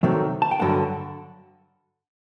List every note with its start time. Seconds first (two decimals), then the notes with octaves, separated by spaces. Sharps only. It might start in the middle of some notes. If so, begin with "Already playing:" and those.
0.03 C3 D#3 F#3 A3 C4
0.42 A5
0.51 G5
0.60 G2 D3 F#3 F#5 A5